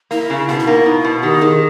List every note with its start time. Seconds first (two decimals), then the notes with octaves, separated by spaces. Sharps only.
0.11 A#3 E4
0.30 C#3
0.49 B2 E4
0.59 E4
0.67 A#3 D#4
0.86 B2 E4
1.05 B2
1.23 D#3 G4
1.42 D#3 G#4